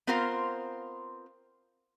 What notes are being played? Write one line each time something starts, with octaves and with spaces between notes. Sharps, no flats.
B3 C4 F4 A#4 C5 F5